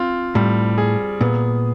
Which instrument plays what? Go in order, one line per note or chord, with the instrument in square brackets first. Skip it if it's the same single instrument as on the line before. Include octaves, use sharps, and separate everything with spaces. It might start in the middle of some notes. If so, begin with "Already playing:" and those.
Already playing: [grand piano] C4 F4
[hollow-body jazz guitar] A2 [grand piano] G3
[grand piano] G#4
[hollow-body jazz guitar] A#2 [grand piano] B3